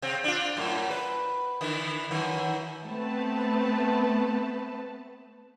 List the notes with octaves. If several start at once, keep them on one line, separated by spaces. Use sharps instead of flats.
C3 C4
D4 F4
F#2 A2
B4
D3 E3
F#2 D#3
A3 B3 C4 B4 A5